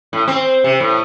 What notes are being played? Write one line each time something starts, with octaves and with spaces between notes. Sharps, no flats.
A2
C4
C3
A2